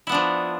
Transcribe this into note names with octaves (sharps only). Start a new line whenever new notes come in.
F3 B3 D4 E4